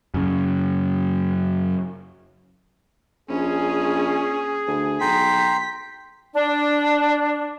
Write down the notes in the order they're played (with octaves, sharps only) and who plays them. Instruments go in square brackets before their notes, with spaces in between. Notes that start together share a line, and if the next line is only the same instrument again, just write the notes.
[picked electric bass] F#2 C#3
[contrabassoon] A#1 [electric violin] C#4 [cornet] G#4
[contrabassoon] D2
[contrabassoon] B1 [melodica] G5 A#5 C6 [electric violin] B6
[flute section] D4